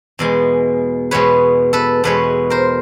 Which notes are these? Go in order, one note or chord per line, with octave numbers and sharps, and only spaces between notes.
E2 B2 G#3
E2 B2 G#3 B4 C#5
A4 B4
E2 B2 G#3 B4 C#5
A#4 C5